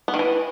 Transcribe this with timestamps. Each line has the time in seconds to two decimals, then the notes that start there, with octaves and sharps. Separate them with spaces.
0.08 B3
0.14 D#3
0.19 E3